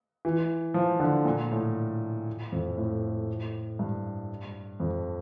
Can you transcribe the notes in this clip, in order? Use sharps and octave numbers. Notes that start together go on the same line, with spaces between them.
E3
F3
D3
A#2
A2
F2
A2
G2
F2